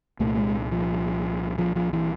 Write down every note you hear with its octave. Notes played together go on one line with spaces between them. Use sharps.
C2 A#2 A3
G#3
F3
F3
F3
E3